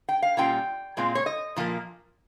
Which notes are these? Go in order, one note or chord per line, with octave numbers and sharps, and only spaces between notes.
G5
F5
A#2 G3 A#3 C#4 F4 G5
A#2 G#3 C4 F4
C#5
D#5
A#2 F3 A#3